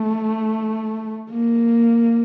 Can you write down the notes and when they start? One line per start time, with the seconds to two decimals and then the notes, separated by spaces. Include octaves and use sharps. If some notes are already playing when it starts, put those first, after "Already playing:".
Already playing: A3
1.31 A#3